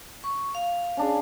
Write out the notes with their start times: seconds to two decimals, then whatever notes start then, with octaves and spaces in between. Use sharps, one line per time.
0.24 C#6
0.55 F5
0.97 C#4 D4 G#4